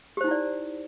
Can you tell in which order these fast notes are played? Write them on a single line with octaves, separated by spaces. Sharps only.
G4 C5 D#4 E4 D5